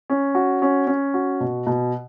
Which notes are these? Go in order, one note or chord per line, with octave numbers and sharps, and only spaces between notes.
C#4
F#4
C#4
C#4
F#4
B2
B2